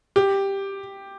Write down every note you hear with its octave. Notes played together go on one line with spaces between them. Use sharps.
G4